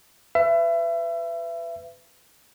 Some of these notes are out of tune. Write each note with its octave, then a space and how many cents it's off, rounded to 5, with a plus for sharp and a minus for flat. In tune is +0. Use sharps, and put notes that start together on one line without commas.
B4 +25 E5 +30